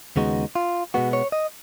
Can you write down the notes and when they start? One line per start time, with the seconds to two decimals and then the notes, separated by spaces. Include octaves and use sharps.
0.16 D#2 C#3 G#3 B3 D#4 F#4
0.55 F4
0.94 B2 G#3 B3 F#4
1.13 C#5
1.32 D#5